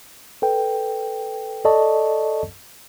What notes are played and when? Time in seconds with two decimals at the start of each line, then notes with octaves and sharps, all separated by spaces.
0.42 A4 B4 G5
1.65 A4 D5 D#5 A5 C#6